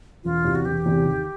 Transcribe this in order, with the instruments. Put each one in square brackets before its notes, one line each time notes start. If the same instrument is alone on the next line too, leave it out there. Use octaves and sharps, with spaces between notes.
[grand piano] E1 [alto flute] F4
[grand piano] E2 C3 E3
[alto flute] F#4
[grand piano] E1 [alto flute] G4
[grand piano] E2 C3 E3
D#2